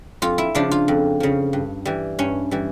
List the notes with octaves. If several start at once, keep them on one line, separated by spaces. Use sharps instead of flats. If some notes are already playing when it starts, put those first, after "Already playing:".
F2 F4
E4
C#3 F3 D4
F4
F2
C#3 F3
G2
E3 G3
G2 C#4
E3 G3